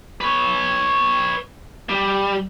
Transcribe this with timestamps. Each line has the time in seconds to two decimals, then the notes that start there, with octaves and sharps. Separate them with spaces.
0.21 B4 C#5
1.89 G3